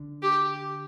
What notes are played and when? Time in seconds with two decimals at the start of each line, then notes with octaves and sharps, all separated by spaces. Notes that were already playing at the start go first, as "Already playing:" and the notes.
Already playing: D3
0.22 G4